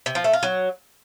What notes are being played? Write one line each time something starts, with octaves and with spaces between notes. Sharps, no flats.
C3
F3
A3
F4
F#3